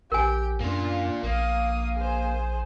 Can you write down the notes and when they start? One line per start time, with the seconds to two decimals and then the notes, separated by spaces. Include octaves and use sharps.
0.12 A#1 G4 A#4 G#5
0.60 F#2 A#3 D4 F4
1.23 A#1 A#3 F5 D#6
1.95 G#4 C5